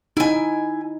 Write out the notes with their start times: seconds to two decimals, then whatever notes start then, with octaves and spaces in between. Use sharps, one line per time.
0.17 D#4 E4 G#5